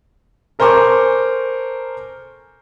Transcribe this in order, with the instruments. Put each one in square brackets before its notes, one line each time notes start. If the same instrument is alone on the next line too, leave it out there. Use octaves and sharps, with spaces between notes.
[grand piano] A4 A#4 C5 G#5 C#6 D6